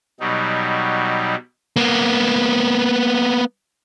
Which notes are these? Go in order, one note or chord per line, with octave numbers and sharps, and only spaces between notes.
B2 F#3 G3 D#4
A#3 B3